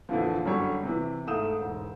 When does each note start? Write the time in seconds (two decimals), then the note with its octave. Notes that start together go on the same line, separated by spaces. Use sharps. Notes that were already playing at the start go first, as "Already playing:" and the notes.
0.09 F2 A#2 D3 E3 F3
0.45 F#2 D3 G3 C#5
0.83 C3 E3
1.27 G#2 A3 F5 D#6 G6 E7
1.58 E1 G#2